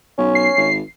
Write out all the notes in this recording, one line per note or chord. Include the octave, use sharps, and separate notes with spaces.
B1 C#4
C7
G#1